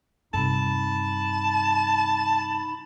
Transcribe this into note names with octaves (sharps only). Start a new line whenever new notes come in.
G2 C3 D#4 A5 B5